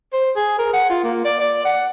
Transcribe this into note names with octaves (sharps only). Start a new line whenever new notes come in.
C5
G#4
A#4
F#5
F4
A#3
D5
D5
F#5